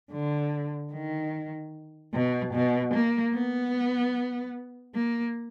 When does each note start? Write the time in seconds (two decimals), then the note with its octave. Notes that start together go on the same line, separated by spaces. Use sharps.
0.12 D3
0.93 D#3
2.14 B2
2.54 B2
2.94 A#3
3.34 B3
4.95 A#3